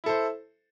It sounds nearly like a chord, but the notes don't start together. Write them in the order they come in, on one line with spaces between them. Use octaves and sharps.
E4 A4 C5